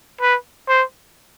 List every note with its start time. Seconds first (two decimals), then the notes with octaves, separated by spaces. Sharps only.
0.21 B4
0.68 C5